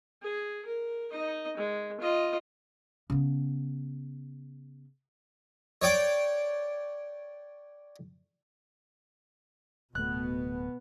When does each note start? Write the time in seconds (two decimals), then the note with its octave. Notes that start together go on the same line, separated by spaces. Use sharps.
0.22 G#4
0.66 A#4
1.12 D#4 D#5
1.57 G#3
2.01 F4 D#5
3.10 C#3 B3
5.82 C#5 D5 G5 D6
9.95 D1 B2 A3 B3 F#6